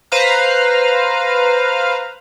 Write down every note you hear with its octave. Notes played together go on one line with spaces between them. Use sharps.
B4 C5 F5 A#5 F6